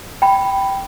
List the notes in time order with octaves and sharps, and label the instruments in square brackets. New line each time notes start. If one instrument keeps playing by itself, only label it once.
[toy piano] G5 B5